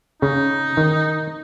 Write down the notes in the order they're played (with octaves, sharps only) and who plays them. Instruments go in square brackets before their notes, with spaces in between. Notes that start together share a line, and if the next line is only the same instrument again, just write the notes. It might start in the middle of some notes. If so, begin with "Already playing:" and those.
[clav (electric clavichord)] C#3 [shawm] D#4
[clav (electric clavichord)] D#3